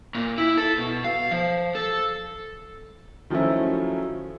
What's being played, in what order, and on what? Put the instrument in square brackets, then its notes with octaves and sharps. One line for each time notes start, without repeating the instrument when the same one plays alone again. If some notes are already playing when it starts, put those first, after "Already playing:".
[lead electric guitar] A#2
E4
A4
B2
F5
F3
A4
[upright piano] D#3 F3 F#3 A3 C#4 E4